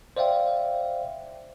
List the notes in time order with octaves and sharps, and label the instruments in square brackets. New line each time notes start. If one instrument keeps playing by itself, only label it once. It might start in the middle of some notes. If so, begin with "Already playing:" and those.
[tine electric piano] C5 D5 E5 F5 G5